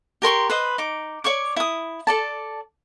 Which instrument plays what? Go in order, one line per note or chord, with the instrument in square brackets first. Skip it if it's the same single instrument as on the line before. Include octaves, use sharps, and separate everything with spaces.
[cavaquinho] G4 A#4 C6 C#6
B4 C5 D#5
D#4 D6
C#5 D5 C#6 D6
E4 D#6
A4 D5 A5